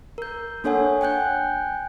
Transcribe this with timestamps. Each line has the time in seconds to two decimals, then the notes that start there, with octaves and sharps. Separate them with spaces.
0.18 A#4 G6
0.64 A#3 D4 A4 C#5 F#5 G#5
1.01 G5 G#5 F#6 G6